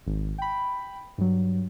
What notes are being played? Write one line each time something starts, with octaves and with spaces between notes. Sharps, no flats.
G#1
G5 B5
G2 F#3